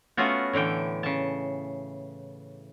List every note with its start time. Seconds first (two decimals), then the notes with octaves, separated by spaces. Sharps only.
0.17 A3 B3 C#4 F4 F#4
0.53 A2 D3 E3 G5
1.03 C#3 A5